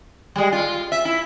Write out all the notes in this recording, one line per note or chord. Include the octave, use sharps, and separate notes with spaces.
G3 G#3
F4
E5
E4